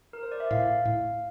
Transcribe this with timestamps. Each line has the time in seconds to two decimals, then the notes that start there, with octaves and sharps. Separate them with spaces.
0.13 A#4
0.23 C5
0.32 D5
0.40 E5
0.50 A2 F5
0.85 A2